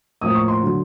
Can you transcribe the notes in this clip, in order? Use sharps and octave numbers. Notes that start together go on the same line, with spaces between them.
A2 F3 A#3 D#6
C#6
C6
D3 F#3